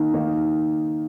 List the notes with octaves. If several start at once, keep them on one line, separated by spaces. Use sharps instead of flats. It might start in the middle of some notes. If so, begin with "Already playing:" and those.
Already playing: D#3 A#3 D#4
D#3 A#3 D#4